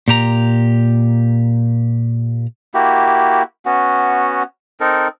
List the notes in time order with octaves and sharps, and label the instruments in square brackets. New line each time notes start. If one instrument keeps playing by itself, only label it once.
[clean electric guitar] A#2 G4 A#5
[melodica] A#3 E4 F#4 G4
B3 C#4 F#4
C4 D#4 A4 A#4